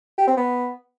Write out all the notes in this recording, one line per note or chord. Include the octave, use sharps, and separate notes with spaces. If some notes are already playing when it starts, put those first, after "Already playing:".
G4
C4
B3